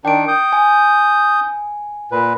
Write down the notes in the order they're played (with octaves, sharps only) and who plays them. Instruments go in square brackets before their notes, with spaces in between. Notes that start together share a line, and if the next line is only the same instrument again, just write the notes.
[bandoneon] D#3 D4 [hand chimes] G5 D7
[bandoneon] D#6 G6
[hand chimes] G#5
[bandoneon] A#2 B4